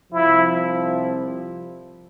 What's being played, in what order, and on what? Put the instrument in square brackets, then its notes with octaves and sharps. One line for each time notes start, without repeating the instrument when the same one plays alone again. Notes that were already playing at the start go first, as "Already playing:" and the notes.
[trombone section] C2 C3 F3 [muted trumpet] E4